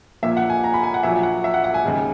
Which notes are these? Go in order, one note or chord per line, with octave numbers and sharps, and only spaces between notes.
A#1 A#2 A#3 E5
F#5
G#5
A#5
B5
G#5
F#5
A#1 A#2 F#3 E5
F#5
E5
F#5
F#5
G#5
D#2 C#3 G#3